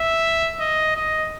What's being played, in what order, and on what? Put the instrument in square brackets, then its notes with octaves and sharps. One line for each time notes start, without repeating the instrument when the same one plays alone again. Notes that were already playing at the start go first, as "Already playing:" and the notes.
Already playing: [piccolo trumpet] E5
D#5
D#5